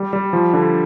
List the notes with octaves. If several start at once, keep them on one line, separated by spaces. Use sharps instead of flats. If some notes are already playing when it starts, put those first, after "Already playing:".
Already playing: G3
G3
F3
D3